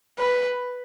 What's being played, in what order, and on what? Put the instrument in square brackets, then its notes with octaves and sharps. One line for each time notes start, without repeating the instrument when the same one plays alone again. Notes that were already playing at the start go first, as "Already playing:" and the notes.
[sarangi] B4